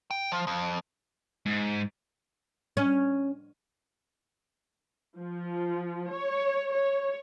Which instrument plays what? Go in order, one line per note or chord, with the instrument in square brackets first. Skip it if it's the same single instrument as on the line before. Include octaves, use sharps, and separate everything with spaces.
[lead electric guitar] G5
F3
F2
[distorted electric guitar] G#2
[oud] C#4
[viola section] F3
C#5
C#5